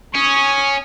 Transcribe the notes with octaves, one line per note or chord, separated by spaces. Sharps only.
C#4 C#6 D#6